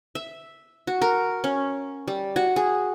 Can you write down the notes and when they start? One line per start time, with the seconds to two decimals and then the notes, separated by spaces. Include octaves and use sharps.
0.15 E5
0.87 F#4
1.02 A#4
1.44 C#4
2.08 G3
2.36 F#4
2.56 G#4